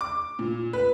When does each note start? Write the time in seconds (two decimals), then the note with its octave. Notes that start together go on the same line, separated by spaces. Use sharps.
0.01 D6
0.39 A#2
0.73 B4